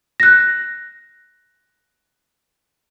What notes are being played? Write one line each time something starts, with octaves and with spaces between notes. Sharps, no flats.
F#6 A#6